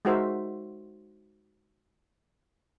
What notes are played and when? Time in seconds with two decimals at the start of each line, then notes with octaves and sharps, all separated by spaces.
0.05 G#3 D#4 F#4 A#4 C5 E5